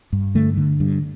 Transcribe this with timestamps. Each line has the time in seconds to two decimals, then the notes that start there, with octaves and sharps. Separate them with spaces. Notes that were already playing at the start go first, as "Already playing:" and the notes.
0.13 G2
0.35 D3 A3
0.57 D3
0.80 G2